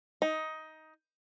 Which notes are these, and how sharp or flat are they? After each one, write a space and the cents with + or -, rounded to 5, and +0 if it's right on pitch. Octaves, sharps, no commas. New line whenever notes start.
D#4 +15